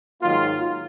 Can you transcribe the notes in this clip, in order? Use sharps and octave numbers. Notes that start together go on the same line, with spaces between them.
G#2 D#3 F#3 A#3 F4